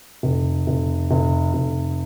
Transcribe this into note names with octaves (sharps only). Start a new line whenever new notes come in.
F1
F1
F1
F1